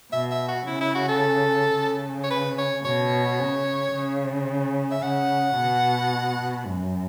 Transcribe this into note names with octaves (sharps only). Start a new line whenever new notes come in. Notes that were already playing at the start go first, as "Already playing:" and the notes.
B2 E5
E5
F#4
C#3 E4
E4
F#4
A4
C#3
C#5
B4
C#5
B2 C#5
C#3
C#3
E5
C#3 F#5
B2
F#2